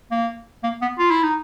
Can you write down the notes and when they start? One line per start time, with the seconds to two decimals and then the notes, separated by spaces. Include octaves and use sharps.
0.11 A#3
0.63 A#3
0.82 B3
0.99 F4
1.11 E4
1.23 D#4